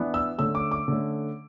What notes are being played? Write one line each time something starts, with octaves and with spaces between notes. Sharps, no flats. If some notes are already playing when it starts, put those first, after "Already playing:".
Already playing: E3 B3 D4
E6
D3 A3 C#4 E6
D6
D6
D3 A3 C#4